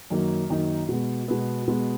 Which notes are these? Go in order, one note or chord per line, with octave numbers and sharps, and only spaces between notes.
F#2 D#3 F#3 A#3 D#4
F#2 D#3 F#3 A#3 D#4
B2 G#3 B3
B2 G#3 B3
B2 G#3 B3